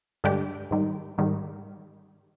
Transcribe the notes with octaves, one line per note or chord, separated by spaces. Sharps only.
G2 D3 G#3 D4 G4
G#2 D#3 G3
G#2 D#3 G3